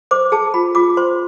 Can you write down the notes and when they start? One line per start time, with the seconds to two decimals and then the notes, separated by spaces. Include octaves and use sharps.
0.11 C5 D6
0.32 G#4 A5
0.54 F4 B5
0.75 F4 D6
0.97 C5 C6